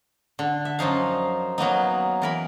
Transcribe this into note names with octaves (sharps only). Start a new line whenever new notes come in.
D3
E5
F#2 F3 D#4 F5
F#3 A#3 B3 D#4
E3 A#4 B5